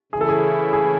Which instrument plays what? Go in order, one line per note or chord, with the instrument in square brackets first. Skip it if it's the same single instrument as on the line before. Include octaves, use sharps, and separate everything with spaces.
[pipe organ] C#3 E3 A3 C#4 E4 [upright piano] G#4
[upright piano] A4
G#4
G#4